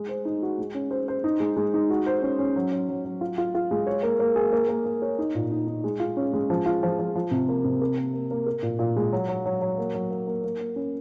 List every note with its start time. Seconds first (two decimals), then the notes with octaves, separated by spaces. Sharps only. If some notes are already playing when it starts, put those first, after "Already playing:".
Already playing: G#3
0.09 C5
0.25 D#4
0.42 F#4
0.58 G#3
0.75 C#4
0.91 C5
1.08 C5
1.24 D#4
1.40 G#3
1.57 G#3
1.74 D#4
1.90 F#4
2.06 C5
2.22 C#4
2.39 C#4
2.56 F#3
2.72 F#3
2.89 F#3
3.05 F#3
3.21 F4
3.38 F4
3.55 F4
3.71 G#3
3.87 C#5
4.03 A#3
4.20 A#3
4.36 G#4
4.52 A#3
4.69 A#3
4.85 A#3
5.02 C#5
5.19 D#4
5.35 A#2
5.51 D#4
5.67 D#4
5.84 G#3
6.00 F4
6.17 C#4
6.33 G#3
6.50 F3
6.66 F4
6.83 F3
6.99 F3
7.15 F3
7.31 C3
7.49 A#3
7.64 C3
7.81 A#4
7.97 A#3
8.14 A#3
8.31 A#3
8.46 A#4
8.62 A#2
8.79 A#2
8.96 G#3
9.12 F#3
9.28 F#3
9.46 F#3
9.61 F#3
9.78 A#3
9.94 F#3
10.11 A#3
10.27 A#3
10.44 A#3
10.61 A#3
10.76 C#4